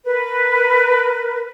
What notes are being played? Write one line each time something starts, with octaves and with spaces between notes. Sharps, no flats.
A#4 B4